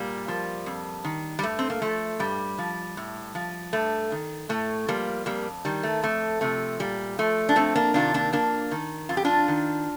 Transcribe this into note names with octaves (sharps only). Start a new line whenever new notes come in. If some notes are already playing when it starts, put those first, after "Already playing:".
Already playing: A#2 G3 A#3
F3
F2
D#3
G3
G2 A3
C4
A#3
F3 A3
G2 G3
F3
A2
F3
G2 A3
D#3
A2 A3
F3 G3 A#3
F2 G3 A#3
D#3 G3
A3
F2 A3
C3 F3 A3
A#2 G3
F3 A3
D4
F2 A3 C4
A#3 D4
C3 D#3 D4 F4
A#3 D4
F2 A#3 D4
D#3
F2 F4
G4
D4 F4
D#3